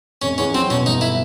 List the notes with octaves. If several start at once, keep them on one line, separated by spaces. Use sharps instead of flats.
F1 C#4
E2 C#4
F#3 C4
B2 C#4
G1 D#4
E4